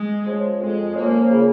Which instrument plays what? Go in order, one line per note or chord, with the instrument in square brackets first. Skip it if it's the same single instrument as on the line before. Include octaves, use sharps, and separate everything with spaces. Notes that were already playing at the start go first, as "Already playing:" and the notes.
Already playing: [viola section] G#3
[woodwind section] F3 C#4
[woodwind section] F2 [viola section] G#3
[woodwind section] F3 C#4 [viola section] A#3
[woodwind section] C#3